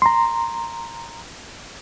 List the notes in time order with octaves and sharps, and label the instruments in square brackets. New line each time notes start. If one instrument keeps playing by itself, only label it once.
[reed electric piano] A#5 C6